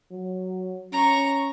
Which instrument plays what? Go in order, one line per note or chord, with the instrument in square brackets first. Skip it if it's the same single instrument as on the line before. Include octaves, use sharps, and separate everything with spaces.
[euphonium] F#3
[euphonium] C#4 [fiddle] A#5 C#6